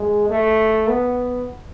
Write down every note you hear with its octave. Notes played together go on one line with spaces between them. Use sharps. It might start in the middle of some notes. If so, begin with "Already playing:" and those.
Already playing: G#3
A3
B3